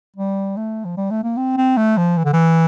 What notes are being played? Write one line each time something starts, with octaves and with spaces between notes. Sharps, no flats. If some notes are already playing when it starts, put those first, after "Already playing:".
G3
A3
F3
G3
A3
A#3
C4
C4
A3
F3
E3
D3
E3